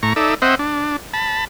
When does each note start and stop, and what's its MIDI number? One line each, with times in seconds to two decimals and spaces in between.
0.03 0.13 45
0.03 0.13 82
0.03 0.13 85
0.16 0.34 63
0.16 0.34 69
0.16 0.34 74
0.16 0.34 76
0.42 0.55 60
0.42 0.55 72
0.42 0.55 75
0.42 0.55 76
0.42 0.55 78
0.59 0.97 62
1.13 1.45 81
1.13 1.45 83